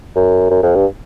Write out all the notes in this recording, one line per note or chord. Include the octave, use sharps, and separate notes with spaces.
F#2
F#2
F2
G2